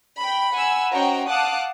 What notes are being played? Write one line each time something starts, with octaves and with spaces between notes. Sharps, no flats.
G5 B5
F#5 G#5 B5 E6
C#4 F#4 C5 D#5 G5 A#5
F5 F#5 A5 D6 D#6 F#6